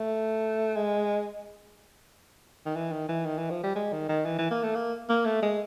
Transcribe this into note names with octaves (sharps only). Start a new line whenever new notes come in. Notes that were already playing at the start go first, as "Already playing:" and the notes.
Already playing: A3
G#3
D#3
E3
D#3
E3
D#3
E3
F3
G3
G#3
D#3
D#3
E3
E3
A#3
A3
A#3
A#3
A3
G#3